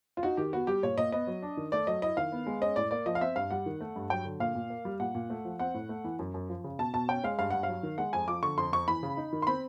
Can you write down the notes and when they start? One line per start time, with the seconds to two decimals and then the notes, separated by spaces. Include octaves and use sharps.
0.17 F4
0.23 D#4 F#4
0.37 D#3 G4
0.53 B3 F#4
0.67 G3 G4
0.83 A#2 C#5
0.97 A#2 D#5
1.12 B3 D#5
1.27 F#3
1.42 D4
1.57 D#3
1.72 A3 D5
1.87 F#3 D#5
2.02 E4 D#5
2.17 D#3 F5
2.32 B3
2.47 G#3
2.62 C#4 D#5
2.76 A2 D5
2.91 A#3 D5
3.06 F3 D#5
3.15 F5
3.21 C4 E5
3.36 G2 F5
3.51 G3 F#5
3.66 D#3
3.80 A3
3.96 G2
4.10 F#3 G5
4.25 D3
4.40 A#2 F5
4.55 A#2
4.70 A#3
4.85 G3
5.00 A#2 F#5
5.15 A#2
5.30 A3
5.45 F3
5.59 C4 F#5
5.74 A2
5.89 A3
6.04 E3
6.19 F#2
6.34 F#2
6.49 F3
6.64 C#3
6.79 B2 A5
6.93 B2 A5
7.09 C#4 G5
7.24 G#3 F5
7.39 G2 F5
7.50 G2 F#5
7.63 F#3 F5
7.83 D#3
7.98 G#3 F#5
8.13 F2 G#5
8.28 F3 D6
8.43 D3 C#6
8.57 F2 C6
8.72 F2 C#6
8.88 E3 B5
9.03 C#3
9.17 D#4
9.33 D#3
9.42 C6
9.47 C4 B5